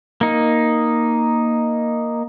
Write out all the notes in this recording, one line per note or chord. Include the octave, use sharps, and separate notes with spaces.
A#3 D#4